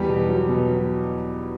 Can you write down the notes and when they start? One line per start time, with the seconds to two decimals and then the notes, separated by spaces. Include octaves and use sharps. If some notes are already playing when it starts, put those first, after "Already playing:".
Already playing: E2 G3 G4
0.09 B2
0.29 F#3
0.49 B2
0.68 F#3